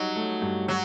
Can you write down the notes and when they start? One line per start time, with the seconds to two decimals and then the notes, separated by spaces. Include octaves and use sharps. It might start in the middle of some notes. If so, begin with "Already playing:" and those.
Already playing: F#3 G3 D#4
0.16 A3
0.42 G2
0.68 F#3 F#4